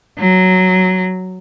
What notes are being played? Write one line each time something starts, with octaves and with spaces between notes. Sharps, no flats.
F#3